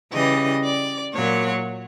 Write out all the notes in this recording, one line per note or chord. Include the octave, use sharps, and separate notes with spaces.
C#3 E3 G3 D#5
D5
A#2 F#3 C#5